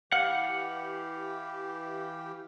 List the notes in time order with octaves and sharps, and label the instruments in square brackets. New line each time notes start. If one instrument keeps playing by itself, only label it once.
[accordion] E3 G4 [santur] F5 [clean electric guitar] F#5